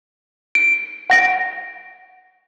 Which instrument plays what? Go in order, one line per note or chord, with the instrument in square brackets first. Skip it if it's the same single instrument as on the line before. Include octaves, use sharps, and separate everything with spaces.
[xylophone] D7
F#5 A#6 D7